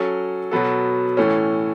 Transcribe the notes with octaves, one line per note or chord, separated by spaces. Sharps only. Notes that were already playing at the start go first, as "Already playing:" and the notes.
Already playing: F#3 C#4 A4
B2 F#3 B3 A4
A2 E3 A3 C#4